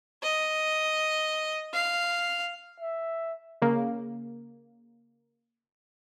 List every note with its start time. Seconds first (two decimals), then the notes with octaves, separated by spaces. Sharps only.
0.23 D#5
1.73 F5
2.80 E5
3.62 C#3 A#3